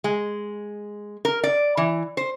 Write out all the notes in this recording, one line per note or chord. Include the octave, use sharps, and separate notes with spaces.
G#3
A#4
D5
E3
C5